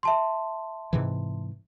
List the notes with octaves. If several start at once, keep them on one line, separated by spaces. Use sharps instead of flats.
E5 A5 C6
G#2 C3 E3